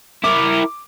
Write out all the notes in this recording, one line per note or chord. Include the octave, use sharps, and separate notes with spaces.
E4 A#4 D6